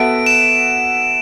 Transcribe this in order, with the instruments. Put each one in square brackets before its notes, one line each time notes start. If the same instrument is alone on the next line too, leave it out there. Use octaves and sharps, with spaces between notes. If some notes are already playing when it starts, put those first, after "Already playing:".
Already playing: [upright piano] B3 F#4 A4 E5 [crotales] D7
[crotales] E7